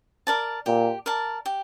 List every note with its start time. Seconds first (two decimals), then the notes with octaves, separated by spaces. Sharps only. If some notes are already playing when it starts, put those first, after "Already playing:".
0.27 A#4 D5 A5
0.66 A#2 G4
1.06 A#4 D5 A5
1.46 G4